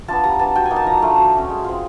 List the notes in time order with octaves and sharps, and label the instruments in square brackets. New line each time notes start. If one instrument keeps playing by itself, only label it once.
[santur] B3 D4 F4 A5
G3 A#5
B3 D4 A5
F#3 G5
G#5
A#3 D#4
A5
F3 A#5
A3 D4 F4
F#3
A3 C#4
G#3
C4 F4